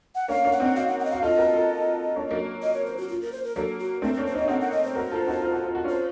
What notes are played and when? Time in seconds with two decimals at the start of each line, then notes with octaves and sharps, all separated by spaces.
0.15 F#5
0.28 A#3 C#4 F5
0.44 A#3 C#4
0.52 F#5
0.60 C4 D#4
0.76 D#4 F#4 F5
0.88 F#5
1.00 F#5
1.05 D#5
1.11 F#4 F5
1.22 F4 A4 D#5
1.37 F#4 A#4
1.54 F4 A4
2.16 A#3 C#4
2.31 F#3 A#3
2.62 D#5
2.74 C#5
2.86 C5
2.97 F#4
3.09 F4
3.22 A#4
3.32 C5
3.44 A#4
3.56 F#3 A#3 A4
3.79 F#4
4.02 A3 C4 A4
4.14 A#3 C#4 A#4
4.26 C5
4.34 D#4
4.37 C#4 D#5
4.48 C4 D#4 F#5
4.61 F#5
4.72 D#5
4.84 C5
4.95 F#4 A#4
5.11 F4 A4
5.27 D#4 F#4
5.42 F4
5.53 F#4
5.64 F4
5.75 F#4
5.84 C#4 F4 C5